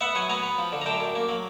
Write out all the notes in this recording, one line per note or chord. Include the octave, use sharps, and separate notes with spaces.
B3 E5 F#5
F#3 F#5 G#5
B3 G#5 A#5
B3
F3
D3
A#5
F#2 G5 A5
F#2
A#3
F#3